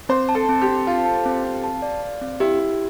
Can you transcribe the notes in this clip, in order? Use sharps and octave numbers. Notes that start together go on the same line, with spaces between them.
C4 C5
A5
A4
C4
G4
C4
F4 A5
A5
C4
C4
A5
D5
D5
C4
E4 G4
G4